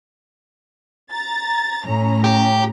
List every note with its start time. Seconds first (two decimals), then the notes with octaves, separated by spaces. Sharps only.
1.12 A#5 A6
1.85 A2 C#4 A#5
2.24 G4